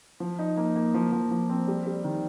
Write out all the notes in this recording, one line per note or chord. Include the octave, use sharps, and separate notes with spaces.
F3
D#4
A#3
A#3
F3
F3
F3
C4
G3
G3
D#3